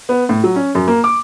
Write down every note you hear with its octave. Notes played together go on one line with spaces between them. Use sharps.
B3
A2
F#3
C#4
F#2
A#3
D6